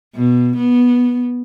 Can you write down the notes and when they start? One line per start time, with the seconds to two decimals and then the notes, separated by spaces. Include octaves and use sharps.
0.15 B2
0.56 B3